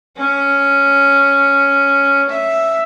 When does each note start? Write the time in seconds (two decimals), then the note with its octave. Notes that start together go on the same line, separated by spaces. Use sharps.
0.17 C#4
2.30 E5